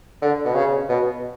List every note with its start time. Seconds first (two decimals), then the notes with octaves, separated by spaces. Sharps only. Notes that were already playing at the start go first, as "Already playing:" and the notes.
0.22 D3
0.45 B2
0.54 C#3
0.89 B2